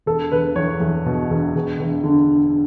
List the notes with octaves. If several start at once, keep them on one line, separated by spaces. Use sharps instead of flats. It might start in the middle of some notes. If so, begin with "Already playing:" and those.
E1 A4
E1 B4
E2 C#5
E2
B2
E1
E1
E1
D3